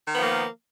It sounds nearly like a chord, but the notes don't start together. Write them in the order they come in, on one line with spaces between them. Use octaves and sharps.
D#3 B3 F3 A#3